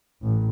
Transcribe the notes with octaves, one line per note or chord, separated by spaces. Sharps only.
A1